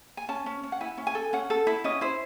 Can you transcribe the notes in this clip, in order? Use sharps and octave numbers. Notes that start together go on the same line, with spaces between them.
G#5
C#4 A5
C#4
C#4
F#5
E4 G#5
C#4
G#5
A4
C#4 F#5
A4
E4
C#4 D#5
E4 C5